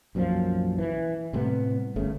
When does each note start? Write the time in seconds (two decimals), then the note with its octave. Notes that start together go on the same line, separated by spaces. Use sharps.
0.15 B1 F#2 A#2 F3
0.78 E3
1.33 A2 C3 G3 B3
1.96 G1 C#3 A3